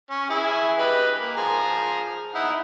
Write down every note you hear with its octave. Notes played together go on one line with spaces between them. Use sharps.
C#4
E4 G#4 E5
G4 B4 D#5
A#3
F3 G#4 A#5
D#4 E4 F#5